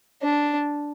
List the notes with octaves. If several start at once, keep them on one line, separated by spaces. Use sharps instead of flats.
D4